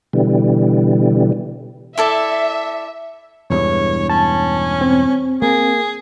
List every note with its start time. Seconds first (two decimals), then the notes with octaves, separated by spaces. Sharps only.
0.13 B2 D3 E3 G3
1.98 E4 A4 D5 E5
3.50 E1 E2 G2 C#5
4.10 C#4 A5
4.81 C4
5.42 A#3 G#4